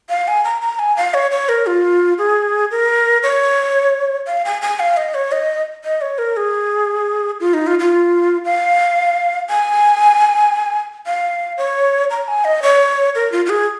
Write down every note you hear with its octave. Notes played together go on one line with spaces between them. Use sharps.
F5
G#5
A#5
A#5
G#5
F5
C#5
C#5
A#4
F4
G#4
A#4
C#5
F5
G#5
G#5
F5
D#5
C#5
D#5
D#5
C#5
A#4
G#4
F4
D#4
F4
F4
F5
G#5
F5
C#5
A#5
G#5
D#5
C#5
A#4
F4
F4
G#4